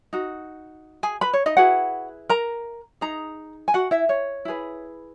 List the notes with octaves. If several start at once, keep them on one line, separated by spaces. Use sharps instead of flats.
D#4 F#4
G#4 G#5
B4 B5
C#5
D#4 D#5
E4 F#4 G#4 B4 F#5
A#4 A#5
D#4 G#4 A#5
G#5
F#4 F#5
E4 E5
C#5
E4 G#4 B4